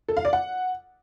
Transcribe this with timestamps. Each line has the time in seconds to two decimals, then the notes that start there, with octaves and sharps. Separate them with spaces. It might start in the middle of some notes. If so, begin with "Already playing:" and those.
0.08 A4
0.17 F5
0.25 D5
0.33 F#5